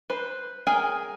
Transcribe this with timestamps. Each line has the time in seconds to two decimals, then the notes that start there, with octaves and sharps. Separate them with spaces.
0.10 B4 C5
0.67 G#4 A#4 G5 G#5